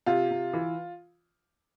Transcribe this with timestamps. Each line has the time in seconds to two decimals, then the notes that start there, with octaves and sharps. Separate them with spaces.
0.06 C3 F4
0.30 C3
0.53 E3